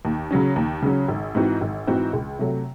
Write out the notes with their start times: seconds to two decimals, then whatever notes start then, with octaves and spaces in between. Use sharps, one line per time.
0.05 D#2
0.31 C#3 F#3 C#4
0.56 D#2
0.82 C#3 F#3 C#4
1.08 G#1
1.35 G#2 E3 C4 F#4
1.61 G#1
1.87 G#2 E3 C4 F#4
2.13 C#2
2.39 C3 F#3 A3